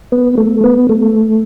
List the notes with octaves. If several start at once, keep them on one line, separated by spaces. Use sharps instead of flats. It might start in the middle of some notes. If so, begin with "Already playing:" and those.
B3
A3
B3
A3